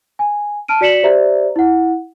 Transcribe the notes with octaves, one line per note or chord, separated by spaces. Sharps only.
G#5
A5 F6 D7 D#7
F#4 D5 B6 C#7 E7 F#7
G4 C5 D5 E5 A#5
E4 F#5